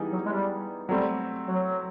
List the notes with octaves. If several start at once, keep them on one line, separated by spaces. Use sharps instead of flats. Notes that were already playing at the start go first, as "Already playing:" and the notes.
Already playing: E3 G3 B3 D#4 G#4
F#3
G#3
G3
F#3 G3 A3 C4
F#3